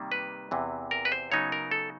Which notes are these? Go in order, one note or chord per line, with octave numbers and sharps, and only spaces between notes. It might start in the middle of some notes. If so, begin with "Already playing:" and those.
Already playing: C3 D#3 G3 A#3
B4
E2 C3 E3
A#4
B4
C5
C#3 F#3 B3 D#4 C#5
A#4
A4